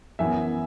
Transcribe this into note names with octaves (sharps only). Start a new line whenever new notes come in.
F#2 E3 B3 E4 E5 G#5